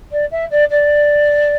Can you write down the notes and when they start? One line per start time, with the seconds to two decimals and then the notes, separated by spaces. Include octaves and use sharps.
0.11 D5
0.31 E5
0.50 D5
0.70 D5